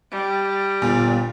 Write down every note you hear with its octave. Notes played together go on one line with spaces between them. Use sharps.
G3
G1 A#2